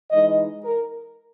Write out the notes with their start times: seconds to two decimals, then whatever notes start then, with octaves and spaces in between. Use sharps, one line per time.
0.11 E3 G#3 D#4 D#5
0.64 A#4